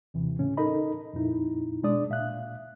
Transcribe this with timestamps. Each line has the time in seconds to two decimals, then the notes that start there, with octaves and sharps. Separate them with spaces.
0.14 D#2 C3 E3
0.39 A2 C#3 C#4
0.57 D#4 A4 A#4 D#5 B5
1.13 F2 A#2 D#4 E4
1.83 B2 G#3 D4 D5 D#6
2.10 A#2 E5 F5 F#6